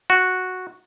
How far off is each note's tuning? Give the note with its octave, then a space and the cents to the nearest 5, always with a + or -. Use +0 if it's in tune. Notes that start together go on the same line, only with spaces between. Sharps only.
F#4 -5